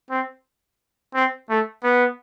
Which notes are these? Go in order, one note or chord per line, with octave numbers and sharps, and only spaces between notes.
C4
C4
A3
B3